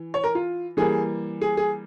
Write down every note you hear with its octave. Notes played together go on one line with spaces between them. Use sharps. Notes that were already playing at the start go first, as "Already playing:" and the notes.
Already playing: E3
C#5
A#4
F4
E3 G3 A#3 G#4
G#4
G#4